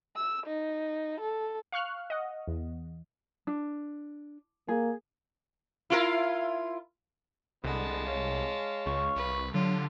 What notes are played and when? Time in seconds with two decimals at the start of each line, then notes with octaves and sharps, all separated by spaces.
0.16 E6
0.47 D#4
1.21 A4
1.72 F5 C#6 F6 F#6
2.10 D#5 F#5
2.48 E2
3.47 D4
4.68 A#3 G#4
5.90 E4 F4 A#4
7.64 C2 D3 G#3 B3 A5
8.06 C#5 F5
8.86 C#2 C#6
9.16 C2 B4
9.54 D3 F#3 F4 G4